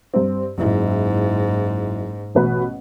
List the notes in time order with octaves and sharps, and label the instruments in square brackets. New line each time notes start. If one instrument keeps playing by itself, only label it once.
[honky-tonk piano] G2 C4
[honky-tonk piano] F#1 E4 [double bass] G#2
[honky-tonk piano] A1 B2 B4